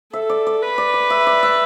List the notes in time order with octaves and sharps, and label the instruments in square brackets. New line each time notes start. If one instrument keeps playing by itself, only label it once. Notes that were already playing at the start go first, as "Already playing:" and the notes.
[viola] A4 [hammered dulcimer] E5
[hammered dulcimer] D5
D5
[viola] B4
[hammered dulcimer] D5
D5
E5
D5
E5